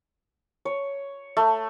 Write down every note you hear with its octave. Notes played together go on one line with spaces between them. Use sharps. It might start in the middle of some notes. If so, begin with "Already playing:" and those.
C#5
A3